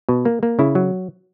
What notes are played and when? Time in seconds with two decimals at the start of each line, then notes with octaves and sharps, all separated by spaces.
0.09 B2
0.25 A#3
0.43 A#3
0.59 C#3 E4
0.75 F#3